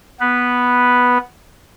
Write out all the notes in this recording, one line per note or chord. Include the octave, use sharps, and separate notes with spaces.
B3 B4